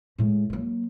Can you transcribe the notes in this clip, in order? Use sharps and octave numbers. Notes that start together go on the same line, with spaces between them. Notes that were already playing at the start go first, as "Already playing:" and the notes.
A2 G#3
F#3 A#3